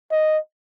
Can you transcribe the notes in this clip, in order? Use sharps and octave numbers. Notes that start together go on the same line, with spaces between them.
D#5